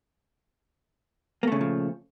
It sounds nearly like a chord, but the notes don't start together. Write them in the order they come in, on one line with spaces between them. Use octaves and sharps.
A#3 A3 C#3 A#2 F3